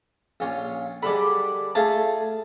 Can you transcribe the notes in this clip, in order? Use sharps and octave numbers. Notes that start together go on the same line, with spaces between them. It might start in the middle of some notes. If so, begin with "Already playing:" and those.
A#1 C#4 F4
D3 G3 G#3 D5 B5
A3 F4 G#4 A5